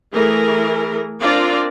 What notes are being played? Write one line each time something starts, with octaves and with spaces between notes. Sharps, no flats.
E3 A3 G#4 A#4
C4 D4 F4 A#4 D5